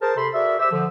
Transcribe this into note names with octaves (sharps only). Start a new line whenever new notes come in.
G#4 A#4 C5 A5
C3 A4 B5 C6
F#4 G#4 A#4 D5 E5
G4 C5 E5 E6
D3 F3